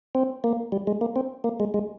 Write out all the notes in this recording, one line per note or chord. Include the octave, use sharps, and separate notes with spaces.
C4
A#3
G3
G#3
A#3
C4
A#3
G#3
G#3